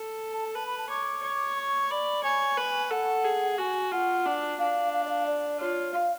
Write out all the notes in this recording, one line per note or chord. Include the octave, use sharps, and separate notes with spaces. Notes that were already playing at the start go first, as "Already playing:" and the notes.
Already playing: A4
A5
B4 A5
B5
A5
C#5 D6
C#5
C#6
D5 B5
C#5 G#5
B4
A4 F#5
G#4
F#4 G#5
F4 F#5
D4
D4 F5
F5
D5
F5
D5
F4 C#5
F5